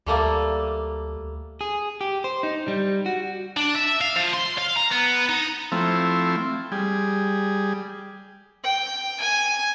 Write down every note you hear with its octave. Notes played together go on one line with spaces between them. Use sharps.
D2 G3 A3 A#3
G#4
G4
C5
D#4
G3
F#4
D4
E5
F5
F3
C6
F5
A#5
B3
D#4
F3 A3 C4 E4
G3 G#4
G5
G#5